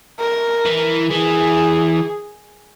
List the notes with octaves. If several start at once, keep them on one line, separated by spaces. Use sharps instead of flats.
A#4
E3
E3 G#4